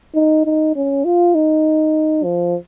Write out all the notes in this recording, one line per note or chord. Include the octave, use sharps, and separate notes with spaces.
D#4
D#4
C#4
F4
D#4
F3